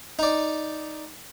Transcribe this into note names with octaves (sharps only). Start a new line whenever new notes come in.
D#4 D5